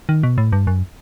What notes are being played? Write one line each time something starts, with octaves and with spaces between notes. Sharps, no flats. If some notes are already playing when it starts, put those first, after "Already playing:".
D#3
B2
A2
G2
F#2